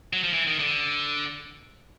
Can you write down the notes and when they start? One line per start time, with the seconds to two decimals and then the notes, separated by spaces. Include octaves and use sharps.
0.13 F#3
0.24 F3
0.33 E3
0.47 D#3
0.59 D3